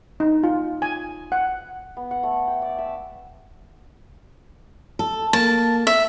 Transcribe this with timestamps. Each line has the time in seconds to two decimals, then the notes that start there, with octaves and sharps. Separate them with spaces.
0.20 D#4
0.43 F4
0.82 G#5
1.32 F#5
1.97 B3
2.11 F#5
2.23 A3
2.48 G5
2.62 D5
2.78 E5
4.99 A4
5.33 A#3 A5
5.87 E5